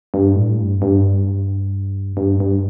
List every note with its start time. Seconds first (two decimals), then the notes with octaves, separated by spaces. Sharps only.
0.14 G2
0.35 A2
0.58 G2
0.82 G2
2.17 G2
2.40 G2